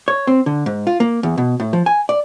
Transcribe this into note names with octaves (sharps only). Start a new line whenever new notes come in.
C#5
C4
D3
G#2
F4
A#3
E2
B2
A2
F3
G#5
D5